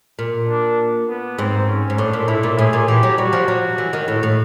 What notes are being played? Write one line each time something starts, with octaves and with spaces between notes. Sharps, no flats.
A#2
D4
B3
G#2 C4
C#4
G#2
A2 D4
A#2
A2 E4
A#2
A2 G#4
A#2
E3 G4
F#3
G3 F#4
F3
F#3
E3
D#3
A2
A2